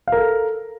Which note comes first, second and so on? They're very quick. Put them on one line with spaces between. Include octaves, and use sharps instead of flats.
F5 A#4 A4